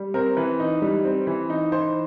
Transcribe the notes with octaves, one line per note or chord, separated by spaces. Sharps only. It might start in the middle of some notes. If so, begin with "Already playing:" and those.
Already playing: G3
C4 A#4
E3 B4
D#4
G3
C4
E3
D#4
E3 C5